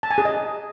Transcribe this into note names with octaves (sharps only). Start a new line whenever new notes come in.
A5
G#5
G#4
D#5